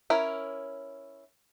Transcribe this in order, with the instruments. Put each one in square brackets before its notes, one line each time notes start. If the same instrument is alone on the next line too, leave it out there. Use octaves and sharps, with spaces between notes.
[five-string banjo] C#4 E4 A#4